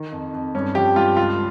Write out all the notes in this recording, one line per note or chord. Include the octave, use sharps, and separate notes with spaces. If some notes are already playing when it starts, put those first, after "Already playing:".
Already playing: D#3
F2
F2
G2 C#4
F3 G4
G2 F4
C#2 F4